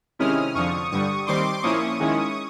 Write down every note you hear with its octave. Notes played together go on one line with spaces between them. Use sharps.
C3 D#3 G#3 C#4 E4 D#6 F6
F2 D3 F3 C#6 D#6
G2 D3 G3 C#6 D#6
D#2 D#3 G3 C4 C6 D6
A#2 F3 A#3 C#4 E4 C#6 D#6
D#3 G#3 C#4 E4